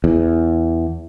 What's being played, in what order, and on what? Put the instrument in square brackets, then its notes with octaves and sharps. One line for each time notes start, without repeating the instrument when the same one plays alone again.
[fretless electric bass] E2